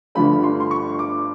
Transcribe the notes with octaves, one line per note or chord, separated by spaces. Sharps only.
G1 G2 D3 F3 A3 B5
C6
C6
C#6
D6